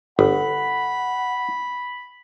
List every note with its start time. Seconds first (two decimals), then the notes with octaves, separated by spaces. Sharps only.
0.19 G1 F#5 B5